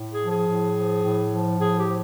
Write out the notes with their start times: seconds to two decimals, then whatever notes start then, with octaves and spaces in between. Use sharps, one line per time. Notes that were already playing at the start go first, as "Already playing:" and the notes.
Already playing: A2
0.11 G#4
0.21 F3
0.30 G#4
0.48 A2
0.77 F3
1.04 A2
1.30 F3
1.59 A2 G#4
1.76 G4
1.86 F3